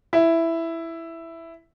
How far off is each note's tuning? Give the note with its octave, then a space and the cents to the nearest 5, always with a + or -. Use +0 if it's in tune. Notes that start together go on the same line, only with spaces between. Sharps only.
E4 +5